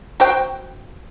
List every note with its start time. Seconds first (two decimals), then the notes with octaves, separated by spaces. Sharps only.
0.20 F#4 C5 G5